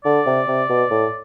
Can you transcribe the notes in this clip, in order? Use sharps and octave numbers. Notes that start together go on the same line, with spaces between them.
D3 D5
C3
C3
B2
A2